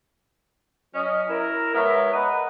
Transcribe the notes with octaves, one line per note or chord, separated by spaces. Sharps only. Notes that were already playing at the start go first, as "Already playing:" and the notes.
F#3 C#4 D#5
E4 A#4
G#3 B3 C#5 E5 A#5
A#4 D#5 F#5 A#5 B5